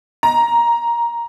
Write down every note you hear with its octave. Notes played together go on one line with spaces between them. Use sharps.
A#5